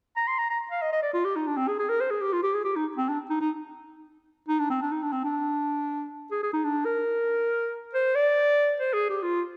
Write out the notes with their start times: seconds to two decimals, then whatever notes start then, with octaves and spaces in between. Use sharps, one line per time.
0.17 A#5
0.28 C6
0.38 A#5
0.50 A#5
0.71 F5
0.82 D#5
0.93 D#5
1.03 D5
1.13 F4
1.25 G4
1.36 D#4
1.47 D4
1.57 C4
1.68 G#4
1.79 G#4
1.89 A#4
2.01 C5
2.11 G#4
2.21 G4
2.33 F4
2.43 G4
2.55 G#4
2.65 G4
2.76 D#4
2.97 C4
3.09 D4
3.30 D#4
3.41 D#4
4.48 D#4
4.60 D4
4.70 C4
4.81 D4
4.92 D#4
5.03 D4
5.13 C4
5.25 D4
6.31 G#4
6.43 G#4
6.53 D#4
6.65 D4
6.85 A#4
7.94 C5
8.15 D5
8.80 C5
8.94 G#4
9.09 G4
9.23 F4